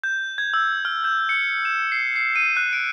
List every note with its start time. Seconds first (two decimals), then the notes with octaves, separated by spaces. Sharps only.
0.04 G6
0.38 G#6
0.54 E6
0.85 F6
1.04 G6
1.29 C#7
1.65 E7
1.92 C7
2.16 C7
2.36 D#7
2.57 F#6
2.73 D7